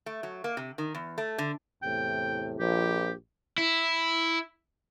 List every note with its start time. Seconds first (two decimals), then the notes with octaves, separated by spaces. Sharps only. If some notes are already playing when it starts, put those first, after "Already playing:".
0.06 A3
0.23 F#3
0.44 A#3
0.57 C3
0.78 D#3
0.95 E2
1.18 A3
1.38 D3
1.83 E2 A2 C3 G5
2.59 A#1 F3 G4
3.58 E4